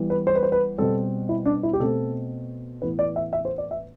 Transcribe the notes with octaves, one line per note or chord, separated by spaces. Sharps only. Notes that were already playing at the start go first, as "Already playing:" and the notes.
Already playing: E3 G3 B3
B4
C5
B4
C5
B4
B2 G3 C4 A4
E4
D4
E4
G4
B2 A3 C4 A4
A2 E3 B3 B4
D5
E5
E5
C5
D5
E5